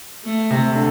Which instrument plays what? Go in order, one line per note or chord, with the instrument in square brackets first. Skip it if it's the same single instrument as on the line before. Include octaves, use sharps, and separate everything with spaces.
[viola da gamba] A3
[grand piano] C3
D3